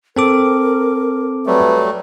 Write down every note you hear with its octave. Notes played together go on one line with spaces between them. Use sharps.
C4 A4 A#4 D6
F#3 G3 A3 B4